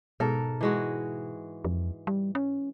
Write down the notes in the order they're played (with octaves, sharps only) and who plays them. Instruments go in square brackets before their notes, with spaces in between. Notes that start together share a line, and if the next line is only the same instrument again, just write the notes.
[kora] G#2 A4 A#4 [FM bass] B2
[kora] E3 G#3 F#4
[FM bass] F2
G3
C#4